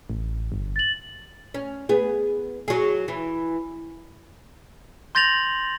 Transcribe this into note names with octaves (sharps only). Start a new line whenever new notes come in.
A1
G1
A6 F#7
C#4
B3 G#4
F#3 G#4
E3
C6 G6 A6 A#6 F7 F#7